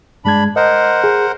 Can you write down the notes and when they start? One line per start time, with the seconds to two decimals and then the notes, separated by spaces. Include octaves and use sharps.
0.25 G2 G#3 D4 B5 G#6
0.56 A#4 C5 D#5 F#5
1.04 G#4